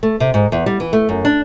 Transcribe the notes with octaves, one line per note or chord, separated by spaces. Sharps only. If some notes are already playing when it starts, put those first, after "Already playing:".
A3
C3
G#2
E2
G3
E3
A3
F#2
D4